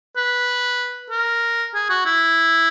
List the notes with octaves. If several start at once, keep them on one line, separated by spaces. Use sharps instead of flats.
B4
A#4
G#4
F#4
E4